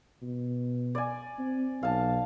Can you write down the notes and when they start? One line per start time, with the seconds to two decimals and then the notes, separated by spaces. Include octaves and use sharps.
0.22 B2
0.95 D5 G#5
1.38 C4
1.83 B1 F5 A5